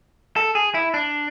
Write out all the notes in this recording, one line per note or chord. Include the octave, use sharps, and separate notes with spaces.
A4
G#4
E4
D4